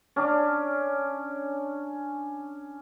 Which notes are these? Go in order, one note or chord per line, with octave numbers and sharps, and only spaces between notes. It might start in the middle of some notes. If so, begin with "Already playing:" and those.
C#4 D4